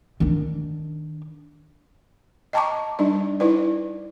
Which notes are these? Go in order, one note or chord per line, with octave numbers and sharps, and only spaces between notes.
D#3 D4
D#5 G5 A5 A#5 C#6 D6
G3 D4 D#4 D5
D#4 E4 B4 D5